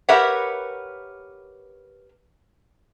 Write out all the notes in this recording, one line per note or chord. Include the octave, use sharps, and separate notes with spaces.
G4 A#4 B4 C#5 E5 F#5